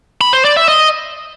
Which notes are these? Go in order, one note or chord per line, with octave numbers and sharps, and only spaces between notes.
B5
C5
D5
E5
D#5